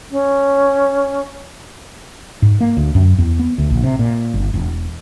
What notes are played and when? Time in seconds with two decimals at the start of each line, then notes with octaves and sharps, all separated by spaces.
0.11 C#4
2.42 G#2
2.61 A#3
2.77 D2
2.95 F#2
3.18 E2
3.39 B3
3.58 D2
3.70 A#1
3.83 C3
3.99 A#2
4.34 G1
4.54 E1